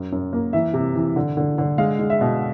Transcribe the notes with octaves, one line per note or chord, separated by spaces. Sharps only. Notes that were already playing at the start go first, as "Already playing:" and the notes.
Already playing: F#2
F#2
A#3
E3 E5
C3
E3
D3
D3
D3
G#3 F5
G#3
E5
B2